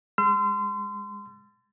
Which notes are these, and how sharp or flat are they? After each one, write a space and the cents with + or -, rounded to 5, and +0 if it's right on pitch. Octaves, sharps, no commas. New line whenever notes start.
G#3 -25 C6 -30 E6 +45